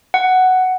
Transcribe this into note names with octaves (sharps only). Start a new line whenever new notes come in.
F#5